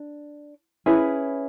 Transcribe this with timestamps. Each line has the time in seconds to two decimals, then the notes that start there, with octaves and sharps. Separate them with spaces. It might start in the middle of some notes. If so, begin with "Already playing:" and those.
Already playing: D4
0.86 C#4 E4 G#4 B4